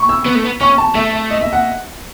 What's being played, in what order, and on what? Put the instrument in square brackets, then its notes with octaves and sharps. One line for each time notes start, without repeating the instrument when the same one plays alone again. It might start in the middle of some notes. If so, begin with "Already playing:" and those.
Already playing: [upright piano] B5 C#6
E6
[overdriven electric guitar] B3
A3
B3
[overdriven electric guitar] C#4 [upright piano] C#6
[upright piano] A5
[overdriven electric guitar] A3 [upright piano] E5
[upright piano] E5
D#5
E5
F#5